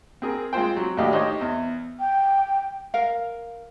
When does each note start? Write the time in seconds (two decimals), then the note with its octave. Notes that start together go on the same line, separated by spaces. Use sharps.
0.22 C4 G#4 A#4
0.53 G#3 C4 F4 C5 G5
0.76 F#3
0.97 D#2 A2 D4 G4 D#5 F5
1.13 D#4 G4 C5 C#5 D#5
1.41 E2
2.00 G5
2.94 A#4 F5